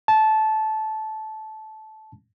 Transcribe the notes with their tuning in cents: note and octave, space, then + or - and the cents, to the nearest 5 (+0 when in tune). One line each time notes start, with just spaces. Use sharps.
A5 -15